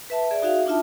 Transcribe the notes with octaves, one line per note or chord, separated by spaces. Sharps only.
B4 E5 A5
G#4 D5 E5
D#4 F#4 G#4 E5 F5
D4 D#4 F4 E5 A5